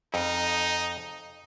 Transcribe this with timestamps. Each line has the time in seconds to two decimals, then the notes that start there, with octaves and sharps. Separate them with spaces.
0.14 F2 D#4